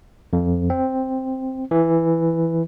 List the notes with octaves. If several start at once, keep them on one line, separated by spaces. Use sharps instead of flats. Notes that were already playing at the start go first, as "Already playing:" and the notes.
F2
C4
E3